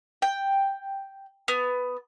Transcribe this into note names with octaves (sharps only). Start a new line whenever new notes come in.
G5
B3